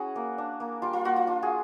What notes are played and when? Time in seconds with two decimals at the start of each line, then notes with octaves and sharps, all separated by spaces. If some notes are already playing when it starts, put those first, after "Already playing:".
Already playing: C#4 E4 F#4 G#4
0.16 A#3
0.38 D4
0.60 A#3
0.82 G3 F4
0.93 F4
1.05 A#3 F#4
1.16 F4
1.27 D4 F4
1.42 F#4 G#4